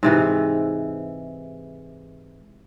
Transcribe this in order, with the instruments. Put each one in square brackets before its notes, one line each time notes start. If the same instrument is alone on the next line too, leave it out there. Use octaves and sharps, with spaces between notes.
[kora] G#2 C3 E3